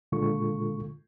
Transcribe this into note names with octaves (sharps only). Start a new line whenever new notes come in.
A#2 D3 G#3 F4 A4 C#6